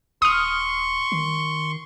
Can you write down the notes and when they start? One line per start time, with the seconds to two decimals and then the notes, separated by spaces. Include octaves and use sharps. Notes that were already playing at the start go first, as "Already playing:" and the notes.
0.22 D#1 C6 C#6 D#6 F6
1.12 D#3